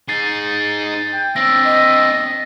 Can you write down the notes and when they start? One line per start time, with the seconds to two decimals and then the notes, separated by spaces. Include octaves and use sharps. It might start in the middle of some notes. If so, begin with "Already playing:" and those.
0.09 D#4 G#4 A6 C7
1.13 G5
1.36 C4 D4 E5 A#6
1.64 D#5